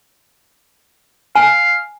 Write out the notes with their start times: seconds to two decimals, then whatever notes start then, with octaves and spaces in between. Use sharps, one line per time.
1.36 F5 G#5